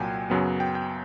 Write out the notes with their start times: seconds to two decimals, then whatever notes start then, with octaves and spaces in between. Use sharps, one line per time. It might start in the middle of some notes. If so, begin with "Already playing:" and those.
Already playing: C2 A#2 F#3 G5 G#5
0.30 F#2 C#3 F#3 B3
0.60 G5
0.75 G5